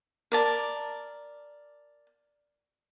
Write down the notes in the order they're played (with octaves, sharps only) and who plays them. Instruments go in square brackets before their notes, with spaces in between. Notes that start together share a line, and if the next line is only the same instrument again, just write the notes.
[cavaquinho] A#4 D5 A5